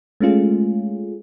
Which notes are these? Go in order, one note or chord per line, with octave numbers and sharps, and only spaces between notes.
G#3 A3 C#4 F4 G#4